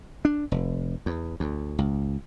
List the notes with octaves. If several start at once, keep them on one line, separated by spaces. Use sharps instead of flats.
D4
F1
E2
D2
C#2